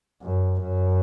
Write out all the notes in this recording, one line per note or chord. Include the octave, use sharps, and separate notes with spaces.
F#2
F#2